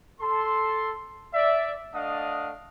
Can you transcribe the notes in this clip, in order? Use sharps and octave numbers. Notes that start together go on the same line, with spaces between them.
A4 C6
D5 E5
A3 D4 D#5 F5 F#5 D#6